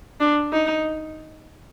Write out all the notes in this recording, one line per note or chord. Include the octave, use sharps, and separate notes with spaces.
D4
D#4